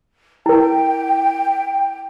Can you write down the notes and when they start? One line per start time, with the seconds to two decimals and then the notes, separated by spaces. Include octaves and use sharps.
0.46 E4 A#4 G5